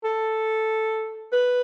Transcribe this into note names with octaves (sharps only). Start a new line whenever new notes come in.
A4
B4